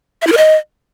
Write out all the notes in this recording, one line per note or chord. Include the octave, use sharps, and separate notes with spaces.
E5
E4
A#4
D#5